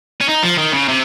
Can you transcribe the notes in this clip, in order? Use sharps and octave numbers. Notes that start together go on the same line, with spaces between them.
C#4
D#4
F3
D#3
C#3
C3